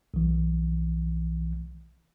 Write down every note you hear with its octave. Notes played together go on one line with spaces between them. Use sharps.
B1 E3